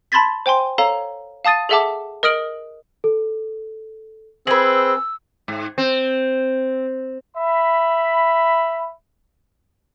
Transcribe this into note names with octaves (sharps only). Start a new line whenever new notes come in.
A5 B5 C6 G#6 A6 B6
C5 G5 G#5 C6
A4 C#5 F5 A#5
F5 A5 D#6 A6 D#7
G#4 A4 E5 F#5 A5 D6
A#4 D#5 D#6 F6 D7 F#7
A4
C4 G#4 B4 E6 F#7
G#2
C4
E5 B5